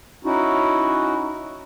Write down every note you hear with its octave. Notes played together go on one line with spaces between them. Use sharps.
C#4 D#4 E4 F#4